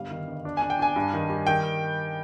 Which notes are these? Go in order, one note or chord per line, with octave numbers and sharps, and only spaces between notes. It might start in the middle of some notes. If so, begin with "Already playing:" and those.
Already playing: G1 G3 F5
D#3
G1
D4
G#5
D4
G5
D4 G#5
G2
D#3
G3
D#3 G5